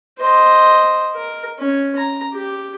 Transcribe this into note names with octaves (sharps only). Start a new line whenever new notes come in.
C5 D#5
A#4
C#4
A#5
G4